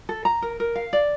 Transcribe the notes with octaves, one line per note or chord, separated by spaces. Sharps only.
A4
A#5
A#4
A#4
F5
D5